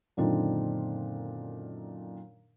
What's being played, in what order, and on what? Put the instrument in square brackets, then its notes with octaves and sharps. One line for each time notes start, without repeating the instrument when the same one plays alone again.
[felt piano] F#2 A#2 D3 D#3 C4 D4